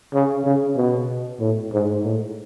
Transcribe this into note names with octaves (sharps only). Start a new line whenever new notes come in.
C#3
C#3
B2
A2
G#2
A2